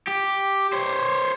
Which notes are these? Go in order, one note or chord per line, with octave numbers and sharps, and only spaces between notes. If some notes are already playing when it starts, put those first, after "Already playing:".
G4
C5 C#5